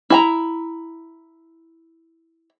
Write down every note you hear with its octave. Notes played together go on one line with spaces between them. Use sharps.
E4 G#5 A#5